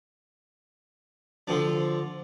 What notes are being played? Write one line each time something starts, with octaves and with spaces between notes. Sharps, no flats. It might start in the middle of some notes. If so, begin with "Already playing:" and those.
D3 F3 D4